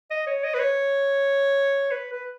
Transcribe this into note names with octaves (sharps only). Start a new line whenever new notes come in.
D#5
C#5
D#5
B4
C#5
B4
B4